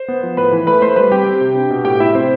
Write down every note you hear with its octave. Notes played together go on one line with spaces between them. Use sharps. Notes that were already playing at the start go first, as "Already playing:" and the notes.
Already playing: C5
B3
F3
A2 B4 B5
E3
A3 B4 B5
A3 C5 C6
G3 B4 B5
C4 G4 G5
C4
C3
D4
B2
A2 G4 G5
A2 E4 E5
C3 C4 C5